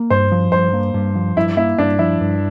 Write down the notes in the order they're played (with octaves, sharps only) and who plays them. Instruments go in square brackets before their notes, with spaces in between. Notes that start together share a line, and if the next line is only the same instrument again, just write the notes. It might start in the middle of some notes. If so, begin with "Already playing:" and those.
Already playing: [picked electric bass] A#3
[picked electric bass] G2 [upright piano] C5
[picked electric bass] F3
[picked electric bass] G2 [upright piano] C5
[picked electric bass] A#3
G2
F3
[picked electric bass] G2 [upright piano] E4
[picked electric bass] A#3 [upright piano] E4
[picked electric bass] G2 [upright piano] D4
[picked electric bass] F3 [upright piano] E4
[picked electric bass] G2